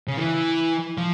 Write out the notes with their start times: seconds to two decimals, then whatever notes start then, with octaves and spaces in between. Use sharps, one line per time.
0.08 C#3
0.18 E3
0.97 F3